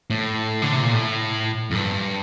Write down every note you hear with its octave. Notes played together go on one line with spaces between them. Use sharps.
A2
D3
C3
A#2
A2
F2
G2